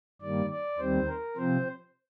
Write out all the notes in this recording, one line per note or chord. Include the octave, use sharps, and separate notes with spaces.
G2 D#3 G3 A#3 D5
D5
D#2 D#3 G3 C4 C5
A#4
C3 F3 C4 C5